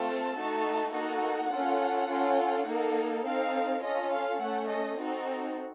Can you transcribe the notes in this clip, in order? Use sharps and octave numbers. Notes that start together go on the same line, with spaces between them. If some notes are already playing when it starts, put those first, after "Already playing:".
Already playing: A3 C4 F4 A4 A5
A3 D#4 F#4 A4
A#3 D#4 F#4 A4 F#5
C#4 F4 A4
C#4 F4 A4
A#3 D#4 A4
C4 D#4 A4 F5
C#4 F4 A4 D#5
F5
A3 C#4 A4 F#5
D#5
C4 D#4 F#4 A4